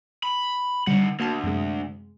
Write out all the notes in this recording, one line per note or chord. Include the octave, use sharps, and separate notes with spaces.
B5
D3 D#3 G3 F#5
D2 A#3 F#4 A5
F#2 C3 G#3